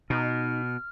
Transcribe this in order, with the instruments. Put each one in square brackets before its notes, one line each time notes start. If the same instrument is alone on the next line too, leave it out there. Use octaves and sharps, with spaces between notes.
[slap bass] B2 [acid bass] D#4 [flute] F6